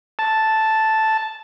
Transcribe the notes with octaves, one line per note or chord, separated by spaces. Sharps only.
A5